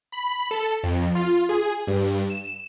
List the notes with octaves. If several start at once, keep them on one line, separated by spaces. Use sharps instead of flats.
B5
A4
F2
F4
G#4
G2
E7